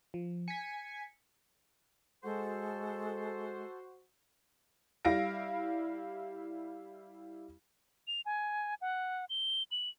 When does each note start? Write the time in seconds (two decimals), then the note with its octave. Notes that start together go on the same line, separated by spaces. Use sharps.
0.14 F3
0.48 G#5 B6 C#7
2.24 G#3 F#4 A4 C5
5.05 G3 E4 F5 A#6 D7
8.07 F7
8.26 G#5
8.82 F#5
9.30 G7
9.71 F#7